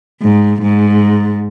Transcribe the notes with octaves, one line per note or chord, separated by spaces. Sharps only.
G#2
G#2